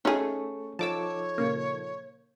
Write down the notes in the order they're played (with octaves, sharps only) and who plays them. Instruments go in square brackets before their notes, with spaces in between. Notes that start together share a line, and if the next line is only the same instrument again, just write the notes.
[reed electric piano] A3 A4 C#6 [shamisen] C#4 G#4 [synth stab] D#4
[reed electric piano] F3 D#4 A4 [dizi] C#5 [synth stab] A5 D6 E6
[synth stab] A#2 C#3 A#3